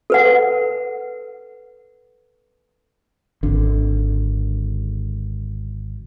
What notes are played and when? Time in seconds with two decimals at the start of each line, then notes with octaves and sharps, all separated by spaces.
0.10 A4 B4 F#5
3.43 G#1 D3